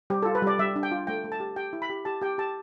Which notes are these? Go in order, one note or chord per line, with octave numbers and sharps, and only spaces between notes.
G3 G4
F4 A4
B4
G3 D5
G3 E5
D4
G5
F4
A3 G5
A3
A5
G4
G4 G5
E4
B5
G4
G4 A5
G4 G5
G4 A5